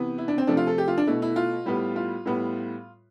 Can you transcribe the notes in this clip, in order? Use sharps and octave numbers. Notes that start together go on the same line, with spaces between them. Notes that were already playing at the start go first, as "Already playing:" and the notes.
Already playing: C3 E3 B3
E4
D4
C4
C3 F3 A3 D4
F4
A4
G4
F4
D4
B2 A3 E4
E4
F4
A2 G3 B3
F4
A2 G3 B3